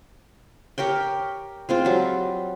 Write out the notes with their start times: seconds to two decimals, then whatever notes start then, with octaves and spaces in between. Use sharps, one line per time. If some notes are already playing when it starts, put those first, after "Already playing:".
0.78 G4 A#4 C#5 G5
1.69 G#3 C4 F4
1.85 F#3 G3